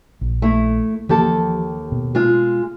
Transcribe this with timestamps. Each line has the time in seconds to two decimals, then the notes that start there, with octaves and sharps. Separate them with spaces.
0.21 A#1
0.42 A3 E4
1.09 D#2 E3 F3 G4 A4
1.92 B2
2.15 G#3 F4